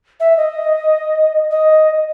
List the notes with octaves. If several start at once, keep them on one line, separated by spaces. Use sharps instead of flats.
E5
D#5
D#5